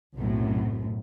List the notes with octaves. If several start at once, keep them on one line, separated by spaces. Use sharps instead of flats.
B1 F#2 A2 C3